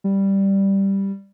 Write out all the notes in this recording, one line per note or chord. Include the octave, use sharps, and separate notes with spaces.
G3